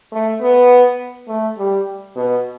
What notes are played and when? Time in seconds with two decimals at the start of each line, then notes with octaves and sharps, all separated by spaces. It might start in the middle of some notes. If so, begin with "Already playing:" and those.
0.12 A3
0.41 B3
1.28 A3
1.57 G3
2.16 B2